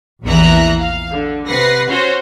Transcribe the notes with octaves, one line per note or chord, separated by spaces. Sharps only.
A#1 E2 E3 E5 A#5 F#6
F5
D3
C3 B4 F#5 A#6 C7
C#4 F#4 C5 C#5